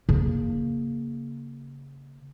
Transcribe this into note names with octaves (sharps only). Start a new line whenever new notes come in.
C#3 A#3